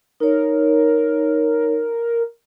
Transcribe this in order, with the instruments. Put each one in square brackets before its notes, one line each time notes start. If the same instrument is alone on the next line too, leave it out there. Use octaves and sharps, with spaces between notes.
[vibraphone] D#4 C#5 [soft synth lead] A#4